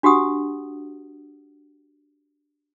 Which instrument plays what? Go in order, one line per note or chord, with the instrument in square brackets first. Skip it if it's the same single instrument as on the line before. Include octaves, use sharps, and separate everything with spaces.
[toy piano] D4 F#4 G4 F#5 D#6